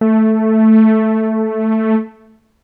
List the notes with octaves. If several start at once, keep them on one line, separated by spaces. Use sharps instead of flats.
A3